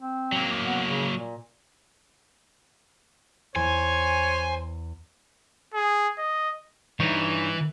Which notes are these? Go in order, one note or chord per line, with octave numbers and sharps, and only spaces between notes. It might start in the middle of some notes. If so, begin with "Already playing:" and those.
C4
F#3 A#3
B3
C#3
A#2
E2 C5 C#5 G#5 C#7
G#4
D#5
G2 E3 D#4 C#5